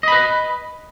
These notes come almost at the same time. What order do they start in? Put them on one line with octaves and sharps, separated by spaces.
D#5 B5 B4